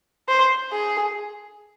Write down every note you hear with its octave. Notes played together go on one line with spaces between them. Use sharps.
C5
G#4